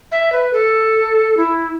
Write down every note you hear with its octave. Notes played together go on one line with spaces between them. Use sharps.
E5
B4
A4
E4